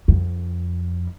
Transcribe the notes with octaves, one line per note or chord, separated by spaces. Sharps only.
F2